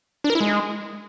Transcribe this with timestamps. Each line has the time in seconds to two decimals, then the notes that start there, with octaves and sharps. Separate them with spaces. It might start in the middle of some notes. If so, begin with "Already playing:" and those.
0.24 D4
0.30 A#4
0.35 E4
0.40 G#3